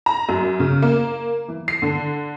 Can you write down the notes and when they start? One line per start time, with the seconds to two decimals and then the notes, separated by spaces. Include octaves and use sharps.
0.06 A#5
0.29 F#2
0.60 C#3
0.82 A#3
1.48 E3
1.68 C7
1.82 D3